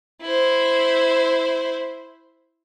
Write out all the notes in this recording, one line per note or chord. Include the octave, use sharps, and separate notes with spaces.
E4 C5